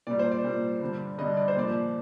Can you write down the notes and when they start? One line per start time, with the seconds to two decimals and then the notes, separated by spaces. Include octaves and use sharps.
0.07 A#2 G3 D5
0.19 C5
0.32 D5
0.44 A#2 G3
0.81 G2 D3 G3
1.18 G2 D3 G3 D#5
1.37 D5
1.48 C5
1.56 A#2 F3 D5